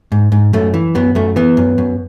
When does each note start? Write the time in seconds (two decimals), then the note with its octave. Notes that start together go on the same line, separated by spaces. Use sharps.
0.12 G#2
0.32 G#2
0.53 F#2 A3
0.74 E3
0.95 F#2 B3
1.15 F#2 A3
1.36 E3 B3
1.57 F#2
1.78 F#2